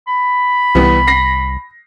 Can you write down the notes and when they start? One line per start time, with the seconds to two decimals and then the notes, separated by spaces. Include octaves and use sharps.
0.08 B5
0.75 C2 E3 G3 B3
1.07 A#6 C7